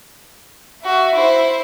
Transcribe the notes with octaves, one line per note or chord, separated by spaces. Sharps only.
F#4 E5
E4 C5